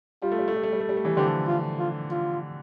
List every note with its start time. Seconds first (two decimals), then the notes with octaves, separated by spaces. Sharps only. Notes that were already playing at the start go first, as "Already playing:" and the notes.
0.22 G3 F4
0.32 A3
0.39 G3
0.48 A3
0.56 G3
0.63 A3
0.72 G3
0.80 A3
0.89 G3
0.97 A3
1.05 E3 G3
1.16 D3 F3 G4
1.48 F4
1.79 F4
2.11 F4